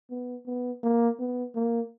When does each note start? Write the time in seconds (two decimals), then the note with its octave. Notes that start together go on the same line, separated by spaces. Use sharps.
0.11 B3
0.46 B3
0.83 A#3
1.20 B3
1.55 A#3